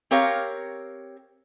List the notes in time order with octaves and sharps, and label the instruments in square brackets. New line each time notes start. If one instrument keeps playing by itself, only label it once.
[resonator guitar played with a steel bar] C4 G4 A#4 C#5 F5